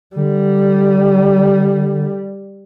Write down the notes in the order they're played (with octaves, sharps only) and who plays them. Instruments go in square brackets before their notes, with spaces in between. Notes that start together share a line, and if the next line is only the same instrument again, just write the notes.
[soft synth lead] D3 [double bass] G3